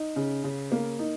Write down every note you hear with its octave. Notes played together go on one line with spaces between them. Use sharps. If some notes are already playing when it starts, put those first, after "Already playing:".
Already playing: D#4
C#3
C#3
A#3
D#4